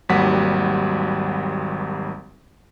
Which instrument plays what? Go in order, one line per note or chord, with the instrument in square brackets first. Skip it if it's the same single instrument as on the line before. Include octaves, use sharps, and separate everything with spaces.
[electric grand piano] G#1 D#2 F#3 G3 F#5 B6